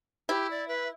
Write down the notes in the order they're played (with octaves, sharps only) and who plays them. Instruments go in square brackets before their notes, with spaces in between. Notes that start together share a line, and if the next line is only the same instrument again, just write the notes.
[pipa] E4 [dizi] G4
[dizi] D5
B4